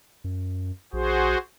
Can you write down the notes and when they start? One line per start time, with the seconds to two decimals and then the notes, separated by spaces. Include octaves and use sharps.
0.24 F#2
0.93 A#1 F#4 G#4 C5